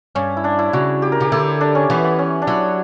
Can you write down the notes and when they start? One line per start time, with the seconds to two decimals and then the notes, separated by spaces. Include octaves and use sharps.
0.15 G2 C#4
0.37 E4
0.44 D4
0.59 E4
0.73 C#3 F#4
1.02 G4
1.12 A#4
1.20 C#3 G4
1.32 D3 E4
1.61 D4
1.75 C#4
1.90 E3 B3
2.04 B3
2.19 C#4
2.42 D4
2.47 F#3 E4